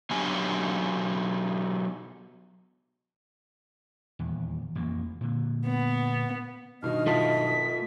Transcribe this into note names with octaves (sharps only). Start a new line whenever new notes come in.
F#3 B3 D4 G4 G#5
D#1 E2
A1 F2 A#3
A#2 D3
B3
G2 B2 D#3 D#5 F6
A3 F4 A5 B6